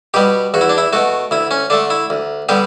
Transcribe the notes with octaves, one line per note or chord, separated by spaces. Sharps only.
B2 G3 B3 G4
E2 F#4
E4
D4
E4
B2 A3 F#4
D2 E4
C#4
D3 A3 D4
E4
D2
D3 G3 B3 G4